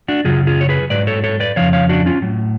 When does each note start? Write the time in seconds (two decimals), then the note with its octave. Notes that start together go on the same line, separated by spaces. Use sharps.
0.08 D4 F#4
0.24 F#2 C#3 F#3 F4 G#4
0.47 F4 G#4
0.61 C#5
0.69 G#4 B4
0.90 G#2 F#3 B4 D5
1.07 A4 C#5
1.24 A4 C#5
1.40 B4 D5
1.56 F2 C#3 F3 C#5 F5
1.73 C#5 F5
1.89 D4 F#4
2.06 C#4 F4
2.22 A2 F#3